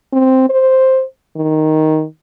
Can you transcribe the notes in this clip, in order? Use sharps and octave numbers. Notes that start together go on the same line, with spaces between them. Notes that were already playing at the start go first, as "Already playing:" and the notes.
C4
C5
D#3